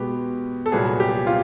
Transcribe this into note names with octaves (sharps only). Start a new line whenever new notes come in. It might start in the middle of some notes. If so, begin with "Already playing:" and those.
Already playing: B2 G#3 B3 G4
A4
C2 A#2 F#3 B3 G#4
G4
F4